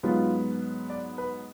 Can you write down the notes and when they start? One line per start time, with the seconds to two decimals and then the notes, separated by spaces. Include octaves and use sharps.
0.03 G#2 F#3 B3 F4
0.90 D5
1.18 B4